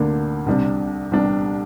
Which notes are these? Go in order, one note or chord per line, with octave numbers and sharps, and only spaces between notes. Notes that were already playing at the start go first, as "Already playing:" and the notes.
Already playing: D2 D3 A#3 D4
C2 C3 G3 D4
C2 C3 G3 D4